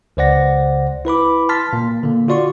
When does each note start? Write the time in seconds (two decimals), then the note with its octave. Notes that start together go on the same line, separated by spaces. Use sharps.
0.17 C#2 C#3 C5 D5 F#5 A#6
1.05 E4 B4 B5 D6
1.49 A5 C6 F6 A6 B6
1.73 A#2 A#3
2.03 D3 A#3
2.28 F4 F#4 D5 C6 C#6